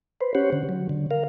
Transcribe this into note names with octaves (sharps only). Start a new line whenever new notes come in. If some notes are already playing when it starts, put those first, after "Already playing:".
B4 C5
C#4 G4 C5 C#5 F#5
D3
F#3
D3
A#4 F5